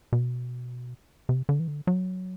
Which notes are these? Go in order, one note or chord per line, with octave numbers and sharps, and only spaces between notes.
B2
C3
D3
E3
D3
F#3